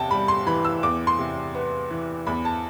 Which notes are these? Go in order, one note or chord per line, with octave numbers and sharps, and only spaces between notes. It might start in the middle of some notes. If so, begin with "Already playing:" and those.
Already playing: E2 C3 G5 A5
G3 B5
C6
E3 B5
E6
E2 D6
C6
C3
B3
E3
E2 B5
A5